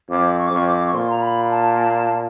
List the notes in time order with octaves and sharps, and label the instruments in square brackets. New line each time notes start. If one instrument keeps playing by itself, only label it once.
[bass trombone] F2 [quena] D6
[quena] C#6
D6
[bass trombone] F2 [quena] C#6
[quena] D6
C#6
[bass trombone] A#2 [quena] C6
[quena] A#5
B5
A5
A5